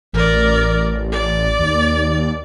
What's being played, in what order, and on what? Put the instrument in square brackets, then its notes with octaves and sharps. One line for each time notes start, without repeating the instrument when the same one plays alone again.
[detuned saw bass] A1 [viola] A#4 D5
[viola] D5
[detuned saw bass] D#2